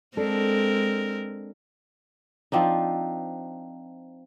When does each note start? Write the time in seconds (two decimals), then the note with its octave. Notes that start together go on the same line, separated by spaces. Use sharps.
0.17 G#3 C4 D4 A4 A#4
2.52 F3 C4 D4 D#4